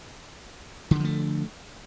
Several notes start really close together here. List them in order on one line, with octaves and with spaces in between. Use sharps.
D3 D#3 F3 A3